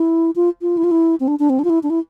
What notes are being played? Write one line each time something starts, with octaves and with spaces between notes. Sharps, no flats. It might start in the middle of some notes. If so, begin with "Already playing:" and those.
Already playing: E4
F4
F4
E4
F4
E4
C4
D4
D4
C4
D4
F4
E4
D4
E4